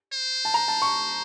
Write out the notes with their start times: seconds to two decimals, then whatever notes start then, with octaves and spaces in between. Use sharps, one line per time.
0.13 C5
0.45 A5
0.54 A#5
0.68 A5
0.82 C#6